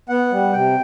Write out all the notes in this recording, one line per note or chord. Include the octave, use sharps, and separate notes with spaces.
B3 F#5
G3
C3 G5